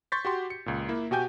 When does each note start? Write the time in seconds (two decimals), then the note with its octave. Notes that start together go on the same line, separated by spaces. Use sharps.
0.12 C6 C#6 G6 A6 B6
0.25 F#4 G4 C6
0.50 C#7
0.66 C#2 A#2
0.88 A#3 E4
1.11 B2 F#4 G4 G5 G#5 G6